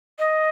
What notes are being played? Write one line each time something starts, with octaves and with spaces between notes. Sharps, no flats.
D#5